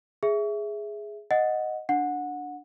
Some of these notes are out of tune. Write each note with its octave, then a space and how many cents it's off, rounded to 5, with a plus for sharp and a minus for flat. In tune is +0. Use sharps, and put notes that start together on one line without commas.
G#4 +0 E5 +0
D#5 +0 F#5 -10
D4 +0 F#5 -20